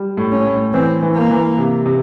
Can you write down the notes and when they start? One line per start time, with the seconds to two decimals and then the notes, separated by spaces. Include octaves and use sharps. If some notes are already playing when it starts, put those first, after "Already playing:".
Already playing: G3
0.17 A2
0.32 C#4
0.47 A2
0.74 E3 C4
1.02 E3
1.16 A#3
1.31 E3
1.58 C3
1.86 C3